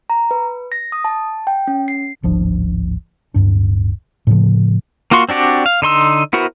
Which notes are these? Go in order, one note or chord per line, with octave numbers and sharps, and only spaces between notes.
A#5
B4
A#6
D#6
A5
G5
C#4
C7
D1 G#1 F3 D4
D1 G2 D4
A2 C#3 F3
A#3 F4 F#4 C6 C#6
C4 D4 F#4 G4 D5
F5
D3 D#4 C6 E6
B3 E4 F#4 A#4 C5